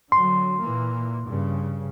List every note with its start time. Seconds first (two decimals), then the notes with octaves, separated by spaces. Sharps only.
0.12 D3 F#3 C6
0.60 A#2 E3 A#3
1.25 G2 C#3